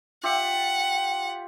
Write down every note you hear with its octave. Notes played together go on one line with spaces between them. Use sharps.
F4 G4 E5 F#5